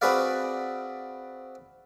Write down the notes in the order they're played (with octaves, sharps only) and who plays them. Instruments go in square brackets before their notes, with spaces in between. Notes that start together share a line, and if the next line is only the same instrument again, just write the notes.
[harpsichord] C4 F#4 G#4 B4 D5 F5